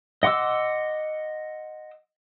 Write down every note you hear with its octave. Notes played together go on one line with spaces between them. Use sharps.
D#5 F#5 C6 D6 E6